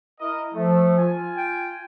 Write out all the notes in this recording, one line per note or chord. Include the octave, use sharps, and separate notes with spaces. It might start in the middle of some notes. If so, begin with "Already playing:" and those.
E4 A#4 D#5
F3 A3
F4 G#5
G5